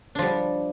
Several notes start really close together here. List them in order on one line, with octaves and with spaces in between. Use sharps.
D4 F3 G3